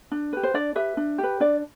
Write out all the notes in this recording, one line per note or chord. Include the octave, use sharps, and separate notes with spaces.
D4
G4 B4
C5
D4 D5
G4 B4 E5
D4
G4 B4
D4 D5